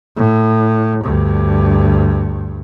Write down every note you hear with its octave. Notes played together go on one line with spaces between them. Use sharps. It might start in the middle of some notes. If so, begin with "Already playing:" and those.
A2
D2 G2